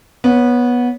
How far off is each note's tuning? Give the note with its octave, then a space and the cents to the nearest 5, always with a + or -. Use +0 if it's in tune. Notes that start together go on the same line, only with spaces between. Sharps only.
B3 -15 C#5 +0